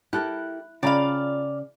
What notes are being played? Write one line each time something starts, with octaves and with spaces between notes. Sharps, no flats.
E4 G4 A4 A#4 F#6
C#3 F4 D5 F5 G5 A#5 B5